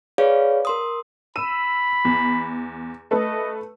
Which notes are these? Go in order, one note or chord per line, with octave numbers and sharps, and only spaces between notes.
G#4 B4 C#5 D5 F5
A#4 C6 D#6
B5 E6 D#7
E2
A3 A4 B4 D#5